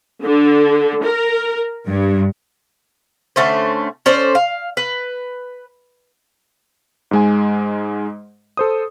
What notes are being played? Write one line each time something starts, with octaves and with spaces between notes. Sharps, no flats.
D3
A#4
G2
D3 A3 C#4 C5
C#4 A4 C5 D5
F5
B4
G#2 G#3 G#5
A4 C5 D#6